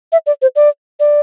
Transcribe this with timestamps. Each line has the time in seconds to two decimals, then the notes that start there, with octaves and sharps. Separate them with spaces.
0.12 E5
0.26 D5
0.42 C5
0.56 D5
1.00 D5